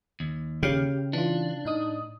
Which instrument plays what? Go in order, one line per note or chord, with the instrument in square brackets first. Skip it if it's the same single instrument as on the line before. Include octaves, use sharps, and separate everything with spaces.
[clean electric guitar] D#2
[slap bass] C#3 [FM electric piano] G4 G5 F6
[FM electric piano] E3 F4 [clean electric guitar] D4
[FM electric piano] A2 D#4 D#6